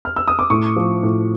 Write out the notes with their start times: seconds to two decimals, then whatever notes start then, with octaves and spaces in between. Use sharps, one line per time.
0.05 F6
0.16 E6
0.28 D#6
0.39 D6
0.50 A2 C#6
0.76 F3
1.03 A2